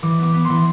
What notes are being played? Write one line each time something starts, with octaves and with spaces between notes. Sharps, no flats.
E3 D6
B3 D6
B3
E3 C6